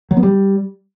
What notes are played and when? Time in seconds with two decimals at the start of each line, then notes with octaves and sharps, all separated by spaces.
0.11 F#3
0.17 B3
0.23 G3